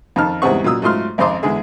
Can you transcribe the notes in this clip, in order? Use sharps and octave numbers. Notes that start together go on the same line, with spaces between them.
F2 D#3 D#4 A5 F6
E2 G#2 G3 C4 F#5 C#6
A#2 F#3 F4 D#6 E6
G#2 F#3 A3 F4 C6 F6
G#1 F2 C5 D#5 C6 D6
E2 D3 G#3 G#4 E5